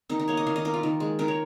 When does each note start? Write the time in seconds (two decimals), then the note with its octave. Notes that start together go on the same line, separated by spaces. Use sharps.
0.09 D#3 D#4
0.19 D#4
0.28 A#3 C#5
0.37 D#5
0.47 D#3 F5
0.56 D#5
0.65 A#3 A#4
0.74 F4
0.83 D#3
1.00 G#3
1.19 D#3 A#4
1.28 C#5